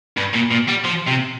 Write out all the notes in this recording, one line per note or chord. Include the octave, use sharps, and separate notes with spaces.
G2
A#2
A#2
G3
F3
C3